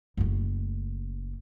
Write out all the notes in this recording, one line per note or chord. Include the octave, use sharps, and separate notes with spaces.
F#1 A3